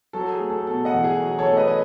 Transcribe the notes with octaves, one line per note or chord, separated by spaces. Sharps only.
F#3 A4
G#4
A3
A4
B2 A4
D#5 F#5
E2
G#4
F#3
A4 C#5
A3
B4 D#5
D#5